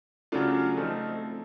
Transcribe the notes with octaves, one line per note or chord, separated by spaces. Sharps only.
C#3 F#3 A3 D4 F4
F3 A3 C4 D#4